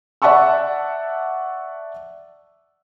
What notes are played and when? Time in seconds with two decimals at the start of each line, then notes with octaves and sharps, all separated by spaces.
0.22 D5 E5 F#5 A5 C#6 E6